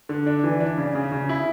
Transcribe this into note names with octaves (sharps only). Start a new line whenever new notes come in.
D3
D4
E3
D4
C#3
C#3
C#3
E4